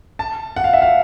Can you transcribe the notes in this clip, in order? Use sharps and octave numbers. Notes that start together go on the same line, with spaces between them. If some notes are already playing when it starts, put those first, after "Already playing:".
A5
F#5
F5
E5
F5